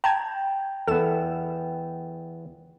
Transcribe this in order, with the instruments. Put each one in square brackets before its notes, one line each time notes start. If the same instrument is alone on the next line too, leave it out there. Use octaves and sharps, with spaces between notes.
[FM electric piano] G5 [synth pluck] A5 A#5 G#6
[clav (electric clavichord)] E2 B3 [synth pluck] A4 E7